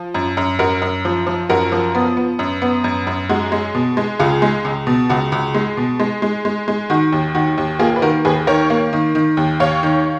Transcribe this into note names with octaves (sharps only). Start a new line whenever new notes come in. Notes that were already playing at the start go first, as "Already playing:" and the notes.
Already playing: F3
F#2
F#2
F#2 F#4 A#4
F#2
F3
F3
F#2 F#4 A#4
F3
B3
B3
F#2
B3
F#2
F#2
G#3 F#4
G#3
B2
G#3
C#2 F4 G#4
G#3
C#2
B2
C#2 F#4
C#2
G#3
B2
G#3
G#3
G#3
G#3
D#3 F#4
D#2
D#3 F#4
D#2
A#3 F4 G#4
B4
D#3 F#4 A#4
D#2 G#4 B4
D#3 A#4 C#5
A#3
D#3
D#3
D#2
D#2 C#5 F5
D#3